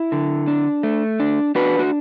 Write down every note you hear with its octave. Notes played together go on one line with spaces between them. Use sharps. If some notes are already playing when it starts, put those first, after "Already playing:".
Already playing: E4
D3
D4
A3
D4
D4 F#4 B4
F#4